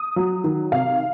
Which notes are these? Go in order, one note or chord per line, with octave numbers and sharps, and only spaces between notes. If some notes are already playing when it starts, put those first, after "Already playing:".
Already playing: D#6
F#3
D#3
C3 F5